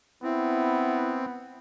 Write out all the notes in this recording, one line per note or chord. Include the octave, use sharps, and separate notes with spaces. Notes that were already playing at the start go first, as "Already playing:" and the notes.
B3 C4 E4